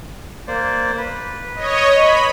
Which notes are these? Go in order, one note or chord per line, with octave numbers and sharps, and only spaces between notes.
A#3 C5 D5
B4
C#5 D#5
B5